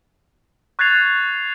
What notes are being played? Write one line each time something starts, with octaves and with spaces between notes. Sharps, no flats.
C#6 F#6 G#6 A6 C7 F7